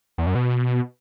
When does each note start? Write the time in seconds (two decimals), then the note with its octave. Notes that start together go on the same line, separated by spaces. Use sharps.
0.18 E2
0.27 F#2
0.35 B2